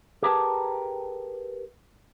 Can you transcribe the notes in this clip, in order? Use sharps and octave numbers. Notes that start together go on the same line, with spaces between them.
G4 G#4 A#4 B4 G5 A5